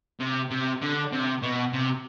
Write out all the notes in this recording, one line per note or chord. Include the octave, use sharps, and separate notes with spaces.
C3
C3
D3
C3
B2
C3